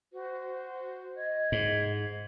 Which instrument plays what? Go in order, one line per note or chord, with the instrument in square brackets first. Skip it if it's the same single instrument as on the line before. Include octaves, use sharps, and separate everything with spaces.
[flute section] F#4 C5
D#5 G#6
[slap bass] G#2